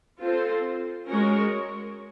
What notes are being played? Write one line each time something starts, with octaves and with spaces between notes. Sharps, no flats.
C4 F4 A4 C5
G#3 C#4 F#4 A#4 C#5